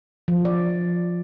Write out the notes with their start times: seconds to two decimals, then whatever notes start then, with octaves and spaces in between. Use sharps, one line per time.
0.28 F3
0.45 D5